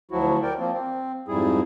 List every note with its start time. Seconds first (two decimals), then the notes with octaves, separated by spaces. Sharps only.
0.11 D2 F3 F#3 E4 F#4
0.42 A#4 D5 G5
0.59 F3 A#3 C4
0.72 C4
1.28 F2 G#2 G3 E4 G#4